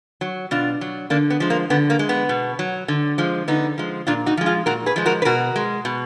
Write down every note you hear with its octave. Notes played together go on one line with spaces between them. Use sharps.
F#3
B2 D4 F4
F#3
D3 A#3 D4
B3
F3 G#3
A#3
D3 B3
A#3
G#3
B3
B2
F#3
D3
F3 G#3
D3 B3 D#4
F3 G#3
A#2 D4 F4
D#4 F#4
F3 G#3
F4 G#4
A#2 F#4 A#4
G#4 B4
F3 G#3
F#4 A#4
B4
B2 F#4 A#4
G#3
B2